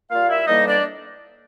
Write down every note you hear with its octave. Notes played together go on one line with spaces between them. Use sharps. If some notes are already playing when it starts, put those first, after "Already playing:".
A#2 G3 A#3 F4 F5
E4 E5
A2 E3 G3 A#3 D#4 D#5
D4 D5